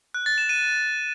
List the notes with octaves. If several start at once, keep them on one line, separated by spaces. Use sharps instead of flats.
F#6
A6
E7
D#7